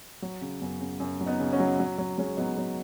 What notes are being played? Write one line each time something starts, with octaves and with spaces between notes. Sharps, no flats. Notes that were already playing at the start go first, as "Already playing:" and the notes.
F#3
C#3
F#2 B3
C#3
F#2
F#3
B3 D#4
C#3
C#4 F#4
F#3
F#3
F#3
F#3 G#3 C#4
F#3 B3 D#4
F#3